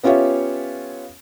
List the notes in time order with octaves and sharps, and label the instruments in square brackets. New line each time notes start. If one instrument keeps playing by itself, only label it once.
[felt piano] B3 C#4 F4 G4 C#5 E5